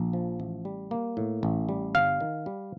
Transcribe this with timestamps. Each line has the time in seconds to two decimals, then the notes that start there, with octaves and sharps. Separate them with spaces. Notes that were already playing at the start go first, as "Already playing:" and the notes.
Already playing: A#1
0.13 F3
0.40 A1
0.65 G3
0.91 A#3
1.17 A2
1.43 A1
1.69 G3
1.95 G1 F5
2.20 D#3
2.46 G3